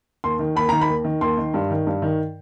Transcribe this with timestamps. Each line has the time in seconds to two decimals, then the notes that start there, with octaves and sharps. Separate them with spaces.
0.24 D#2 C6
0.39 D#3
0.56 D#2 B5
0.69 D#3 A#5
0.81 B5
0.89 D#2
1.05 D#3
1.21 D#2 C6
1.38 D#3
1.54 G2
1.70 D#3
1.87 G2
2.02 D#3